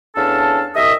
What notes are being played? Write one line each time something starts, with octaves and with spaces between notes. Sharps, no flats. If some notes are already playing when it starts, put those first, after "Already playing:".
E2 C#4 D4 A4 F5 A5
C2 D#5 E5